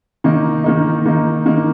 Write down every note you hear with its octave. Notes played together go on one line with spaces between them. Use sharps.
D#3 A#3 D#4
D#3 A#3 D#4
D#3 A#3 D#4
D#3 A#3 D#4